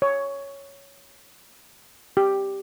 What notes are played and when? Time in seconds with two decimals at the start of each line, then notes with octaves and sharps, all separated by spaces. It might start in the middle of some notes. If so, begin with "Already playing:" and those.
0.02 C#5
2.17 G4